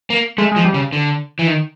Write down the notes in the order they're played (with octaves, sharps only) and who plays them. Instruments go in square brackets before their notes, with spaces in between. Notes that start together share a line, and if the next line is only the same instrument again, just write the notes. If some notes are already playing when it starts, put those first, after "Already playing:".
[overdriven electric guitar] A#3
[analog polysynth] G#3 [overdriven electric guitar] A3
[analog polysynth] G#3
[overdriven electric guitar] F3
[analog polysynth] G3
[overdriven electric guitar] C#3
D3
E3
D#3